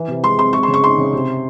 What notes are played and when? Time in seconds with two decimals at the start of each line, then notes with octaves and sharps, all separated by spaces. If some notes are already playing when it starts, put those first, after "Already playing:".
Already playing: E3
0.08 C3
0.23 G#3 C6
0.38 C4 C6
0.53 G#3 C#6
0.63 C6
0.68 C#3
0.74 C#6
0.84 D#4 C6
0.98 C#3
1.13 C3